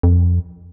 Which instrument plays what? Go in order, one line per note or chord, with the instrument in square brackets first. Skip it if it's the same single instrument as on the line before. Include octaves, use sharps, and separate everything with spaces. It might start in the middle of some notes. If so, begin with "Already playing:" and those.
[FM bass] F2